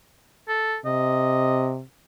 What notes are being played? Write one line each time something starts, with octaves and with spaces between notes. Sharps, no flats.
A4
C3 D#5